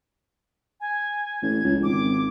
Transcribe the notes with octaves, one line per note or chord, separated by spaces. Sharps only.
G#5
A1 G#6
C#2
G#1 D6